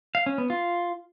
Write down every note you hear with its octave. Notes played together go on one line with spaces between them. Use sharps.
F5
C#4
B3
F4